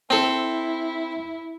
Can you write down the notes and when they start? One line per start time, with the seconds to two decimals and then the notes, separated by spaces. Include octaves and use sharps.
0.10 C4 E4 A4